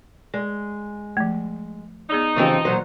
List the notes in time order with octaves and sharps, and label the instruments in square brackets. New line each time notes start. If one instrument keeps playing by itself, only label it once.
[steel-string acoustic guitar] G#3 [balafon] D5
[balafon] F3 A3
[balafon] B3 G#4 D5 [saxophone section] D#4
[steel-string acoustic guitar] C#3 F3 C4 [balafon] E3 G4 D#5
[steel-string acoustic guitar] A#2 F#3 C5 [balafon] D5